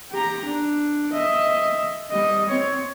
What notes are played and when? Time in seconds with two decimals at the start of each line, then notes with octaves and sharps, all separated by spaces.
0.11 G4 A#5
0.46 D4
1.13 D#5 E5
2.11 G3 D#5
2.49 C4 C#5